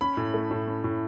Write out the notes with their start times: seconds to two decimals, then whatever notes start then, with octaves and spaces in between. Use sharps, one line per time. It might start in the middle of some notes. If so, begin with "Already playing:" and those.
0.01 C#4 B5
0.17 A2
0.34 A3
0.51 A2
0.67 C#4
0.84 A2